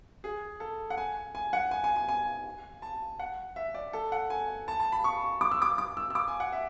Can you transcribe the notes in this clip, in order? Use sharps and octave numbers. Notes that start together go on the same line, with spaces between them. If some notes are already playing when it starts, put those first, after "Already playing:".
G#4
A4
F#5
G#5
G#5
F#5
G#5
G#5
G#5
G#5
A5
F#5
E5
D5
A4
F#5
G#5
A5
A5
B5
C#6
D6
E6
D6
D6
E6
E6
D6
G#5
F#5
E5